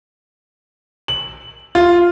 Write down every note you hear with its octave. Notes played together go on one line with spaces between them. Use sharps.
F#7
F4